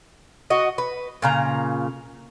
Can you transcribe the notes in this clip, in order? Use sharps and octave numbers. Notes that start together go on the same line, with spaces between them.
F#4 D#5
B4
A#2 C#3 A#5